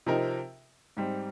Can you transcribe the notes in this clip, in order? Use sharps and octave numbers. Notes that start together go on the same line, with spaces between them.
C3 F3 C4 D#4 A#4
G#2 G3 C4